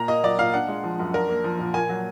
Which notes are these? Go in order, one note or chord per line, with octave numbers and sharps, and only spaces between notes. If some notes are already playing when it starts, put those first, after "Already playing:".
Already playing: A#2 A#5
A#3 D#5
F#3 D5
A#2 F5
D4 F#5
G#3
F3
F#2
D4 A#4
A#3
F3
A#2
A#3 G#5
F#3